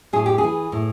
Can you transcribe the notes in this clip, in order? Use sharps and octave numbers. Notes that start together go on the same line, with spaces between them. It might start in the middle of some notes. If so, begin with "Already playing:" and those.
A2 G#4
G4
E3 G#4
A2